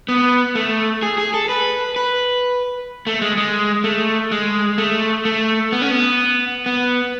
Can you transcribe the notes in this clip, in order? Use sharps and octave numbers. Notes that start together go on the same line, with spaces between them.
B3
A3
G#4
G#4
A4
B4
B4
A3
G#3
G#3
A3
G#3
A3
A3
B3
C#4
B3
B3